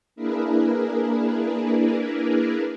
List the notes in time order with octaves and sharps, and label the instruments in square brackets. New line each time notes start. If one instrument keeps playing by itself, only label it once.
[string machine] A#3 D4 E4 G#4 A#4 B4